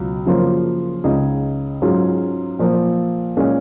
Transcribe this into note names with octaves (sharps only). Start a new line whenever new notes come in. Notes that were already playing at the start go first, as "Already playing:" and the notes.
Already playing: C#2 B2 F#3
F#2 C#3 F3 A#3 F4
C#2 C#3 G#3 D#4 G#4
G#2 F#3 C#4 F4 G#4
A#2 F3 A#3
A#2 G#3 C#4